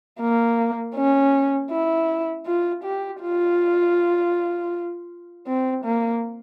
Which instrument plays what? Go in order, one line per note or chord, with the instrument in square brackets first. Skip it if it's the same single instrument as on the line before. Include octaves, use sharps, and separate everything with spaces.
[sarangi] A#3
C#4
E4
F4
G4
F4
C4
A#3